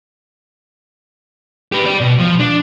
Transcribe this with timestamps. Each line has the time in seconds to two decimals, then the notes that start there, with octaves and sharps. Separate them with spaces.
1.72 G4 B4
1.86 G4 D5
2.01 B2
2.19 F3
2.40 D4